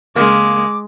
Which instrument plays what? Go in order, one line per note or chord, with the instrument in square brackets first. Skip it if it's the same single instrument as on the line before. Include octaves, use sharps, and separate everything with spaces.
[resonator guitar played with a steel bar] C#3 A#3 [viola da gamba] G#3 [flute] D6